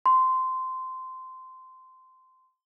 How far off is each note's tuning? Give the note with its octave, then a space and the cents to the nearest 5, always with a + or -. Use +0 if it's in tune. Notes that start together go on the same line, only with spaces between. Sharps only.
C6 -15